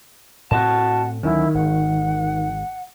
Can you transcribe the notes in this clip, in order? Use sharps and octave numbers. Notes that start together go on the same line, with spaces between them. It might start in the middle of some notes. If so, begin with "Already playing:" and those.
A2 C4 F#4 D#5 F#5 A5
D2 D#3 F#3 C#4 E4
G#1 F#5